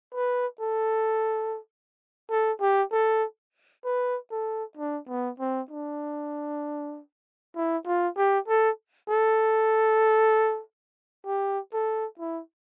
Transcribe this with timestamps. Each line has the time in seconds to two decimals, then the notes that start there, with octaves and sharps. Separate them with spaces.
0.14 B4
0.61 A4
2.31 A4
2.61 G4
2.92 A4
3.85 B4
4.31 A4
4.77 D4
5.08 B3
5.40 C4
5.71 D4
7.56 E4
7.87 F4
8.17 G4
8.48 A4
9.10 A4
11.26 G4
11.73 A4
12.19 E4